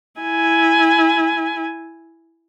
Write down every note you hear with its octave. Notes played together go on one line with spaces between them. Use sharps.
E4 G#5